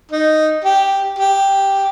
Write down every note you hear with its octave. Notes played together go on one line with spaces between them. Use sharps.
D#4
G4
G4